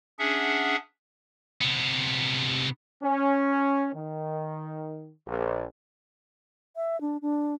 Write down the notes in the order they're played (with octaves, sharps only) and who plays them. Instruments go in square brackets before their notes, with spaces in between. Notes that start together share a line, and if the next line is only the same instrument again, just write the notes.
[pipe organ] C#4 D4 G#4 E5 F#5
[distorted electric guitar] C3 B3
[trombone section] C#4
D#3
A#1
[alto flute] E5
D4
D4